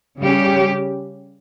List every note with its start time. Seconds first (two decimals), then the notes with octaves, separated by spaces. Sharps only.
0.20 C#3 G3 C#4 G4